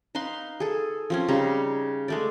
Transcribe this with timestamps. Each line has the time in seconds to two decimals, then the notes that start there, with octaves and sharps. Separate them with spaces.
0.15 D#4 B4 F5 C6
0.60 G#4 A4
1.10 F3 C4 C#4
1.28 C#3 G3 D#4 A#5
2.08 G#3 A3 D5